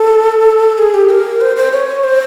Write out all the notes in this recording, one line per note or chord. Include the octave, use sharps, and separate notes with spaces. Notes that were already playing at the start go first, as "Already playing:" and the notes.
Already playing: A4
G#4
G4
A#4
C5
C5
C#5
C5